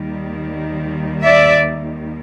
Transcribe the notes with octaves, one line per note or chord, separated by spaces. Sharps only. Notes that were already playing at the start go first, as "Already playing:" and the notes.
Already playing: D#2 D#3 G3
D5 E5